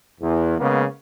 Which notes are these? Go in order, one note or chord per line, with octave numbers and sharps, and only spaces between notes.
E2
C#3 G#3 A#3 B3